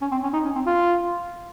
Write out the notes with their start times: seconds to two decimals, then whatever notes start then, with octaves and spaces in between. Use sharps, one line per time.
0.01 C#4
0.12 C4
0.23 C#4
0.33 D#4
0.45 C#4
0.55 C4
0.66 F4